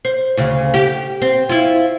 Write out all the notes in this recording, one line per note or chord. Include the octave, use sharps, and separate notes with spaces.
C5
D2 C#3
G4
C4
E4 F4